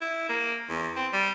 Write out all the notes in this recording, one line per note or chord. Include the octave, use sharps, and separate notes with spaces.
E4
A#3
E2
C4
G3